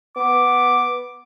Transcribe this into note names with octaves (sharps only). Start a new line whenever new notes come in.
B3 D6